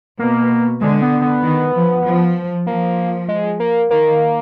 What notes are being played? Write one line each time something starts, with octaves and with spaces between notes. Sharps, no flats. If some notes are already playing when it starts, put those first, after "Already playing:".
B2 A#3
D3 G#3
B3
B3
D#3
F3
F3
F3 A#3
G#3
A#3
D#3 A#3